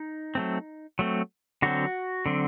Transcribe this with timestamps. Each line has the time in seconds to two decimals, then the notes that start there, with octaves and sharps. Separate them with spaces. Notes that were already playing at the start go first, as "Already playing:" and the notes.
Already playing: D#4
0.35 F#3 A3 C4
0.99 F#3 A3 C4
1.62 D3 F#3 C4 F#4
2.26 D3 F#3 C4